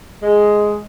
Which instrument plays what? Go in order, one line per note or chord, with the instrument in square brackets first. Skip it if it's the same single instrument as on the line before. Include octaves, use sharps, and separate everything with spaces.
[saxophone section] G#3